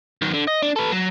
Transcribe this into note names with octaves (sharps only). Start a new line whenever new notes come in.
D#3 F#3
D3
D#5
D4
A4 B4
F#3